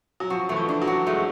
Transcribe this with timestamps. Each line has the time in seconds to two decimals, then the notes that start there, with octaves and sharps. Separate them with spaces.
0.20 F#3
0.30 F3 F#4
0.49 E3 A3
0.56 F3
0.69 D4
0.82 F#3
0.87 F#4
1.06 G#3 A3